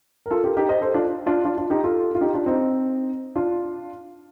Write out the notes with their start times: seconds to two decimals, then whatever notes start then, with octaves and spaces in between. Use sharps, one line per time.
0.26 A#4
0.31 F4 A4
0.44 G4 A#4
0.57 D#4 G4
0.69 C5 D#5
0.81 A4 C5
0.94 D4 F4
1.26 D4 F4
1.45 D4 F4
1.58 D4 F4
1.70 D#4 G4
1.84 F4 A4
2.15 F4
2.21 D#4 G4
2.34 D4 F4
2.46 C4 D#4
3.36 D4 F4